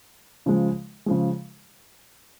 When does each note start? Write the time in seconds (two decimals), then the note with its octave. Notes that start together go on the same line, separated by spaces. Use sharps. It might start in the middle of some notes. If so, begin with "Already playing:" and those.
0.46 C#3 F3 G#3
1.06 C#3 F3 G#3